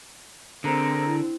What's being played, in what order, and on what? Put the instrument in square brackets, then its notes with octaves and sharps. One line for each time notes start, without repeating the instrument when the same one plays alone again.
[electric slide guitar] D3 [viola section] C4 [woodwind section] G#4 A#4 A#5
[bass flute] E4